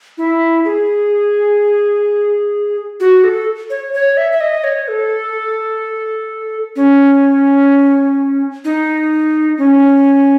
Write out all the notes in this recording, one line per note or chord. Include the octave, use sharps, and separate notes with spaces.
E4
G#4
F#4
A4
C#5
C#5
E5
E5
D#5
C#5
A4
C#4
D#4
C#4